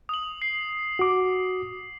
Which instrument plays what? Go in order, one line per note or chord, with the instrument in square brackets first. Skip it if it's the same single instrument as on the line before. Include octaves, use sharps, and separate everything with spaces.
[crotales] D#6 F#7
C7
[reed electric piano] F#4 D6